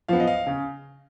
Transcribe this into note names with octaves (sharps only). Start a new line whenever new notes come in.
F3 B3 F5
D#5
F5
C#3